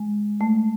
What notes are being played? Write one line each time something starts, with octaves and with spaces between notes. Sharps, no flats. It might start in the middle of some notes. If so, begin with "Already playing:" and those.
Already playing: G#3
A3